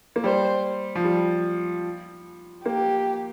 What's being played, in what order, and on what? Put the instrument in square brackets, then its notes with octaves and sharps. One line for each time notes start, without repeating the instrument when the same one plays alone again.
[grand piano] A#3
[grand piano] G3 [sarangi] C5
[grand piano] F3
G3
[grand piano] A#3 [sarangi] G4